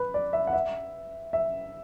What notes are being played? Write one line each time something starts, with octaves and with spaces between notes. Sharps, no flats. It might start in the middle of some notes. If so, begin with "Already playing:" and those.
Already playing: B4
D5
E5
F#5
E5
E5